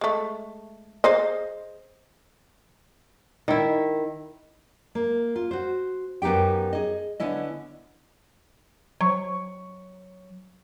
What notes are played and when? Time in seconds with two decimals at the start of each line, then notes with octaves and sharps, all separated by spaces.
0.01 G#3 A3
1.04 G#4 C5 D#5
3.48 D#3 E4
4.95 A#3
5.36 F4
5.51 F#4 C5
6.22 F#2 B3 D#4 G4 G5
6.73 G#4 D#5
7.20 D3 B3 C#4 E4 D#5
9.01 F#3 C#6